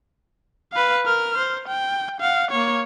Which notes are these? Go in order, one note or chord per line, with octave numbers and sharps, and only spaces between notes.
B4 F5
A#4 F6
C5
G5
F5 F#5
A#3 C#5